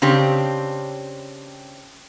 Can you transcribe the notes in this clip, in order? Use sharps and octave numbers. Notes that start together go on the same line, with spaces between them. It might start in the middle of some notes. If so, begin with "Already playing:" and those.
C#3 C4 D4 G4